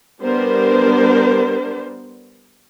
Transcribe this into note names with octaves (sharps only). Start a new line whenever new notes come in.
G3 B3 D4 A#4 C5